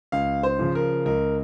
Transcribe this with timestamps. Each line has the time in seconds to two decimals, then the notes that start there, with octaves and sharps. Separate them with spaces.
0.12 C#2 F5
0.43 C5
0.59 C#3 F3
0.75 A#4
1.06 C#2 A#4